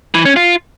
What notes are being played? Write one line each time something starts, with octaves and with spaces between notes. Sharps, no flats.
E3
C#4
F4